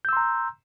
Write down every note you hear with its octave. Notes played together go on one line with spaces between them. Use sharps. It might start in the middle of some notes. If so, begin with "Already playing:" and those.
A#5 C6 E6 G6